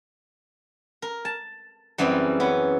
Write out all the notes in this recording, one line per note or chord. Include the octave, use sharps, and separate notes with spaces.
A#4
A5
F#2 E3 G3 C4 G#4 C6
B3 C#4